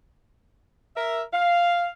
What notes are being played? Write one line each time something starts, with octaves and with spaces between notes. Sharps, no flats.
A#4 E5
F5